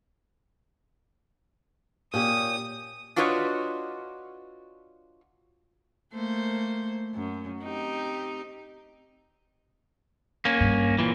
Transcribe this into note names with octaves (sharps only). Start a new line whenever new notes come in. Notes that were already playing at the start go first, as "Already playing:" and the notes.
A#2 C#4 G4 D#6
D4 F4 F#4 B4 C#5 D#5
A3 A#3 C5
F#2
C4 D#4 G4
A#3 C#4
G2
A#2 E3